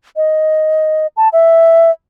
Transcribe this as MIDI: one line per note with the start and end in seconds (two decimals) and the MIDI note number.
0.16 1.07 75
1.17 1.29 81
1.33 1.91 76